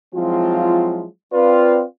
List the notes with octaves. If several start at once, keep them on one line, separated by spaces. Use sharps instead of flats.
F3 F#3 G#3 C4 E4 F4
C4 F4 B4 D5